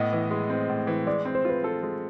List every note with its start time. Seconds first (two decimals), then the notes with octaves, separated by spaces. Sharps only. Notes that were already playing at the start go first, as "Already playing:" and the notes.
Already playing: A2 B3 D#5
0.13 E3
0.31 G#3
0.50 C4
0.69 A2
0.87 E3
1.07 G#3 D5
1.25 C4
1.35 C5
1.45 F4 B4
1.64 A4
1.83 G#3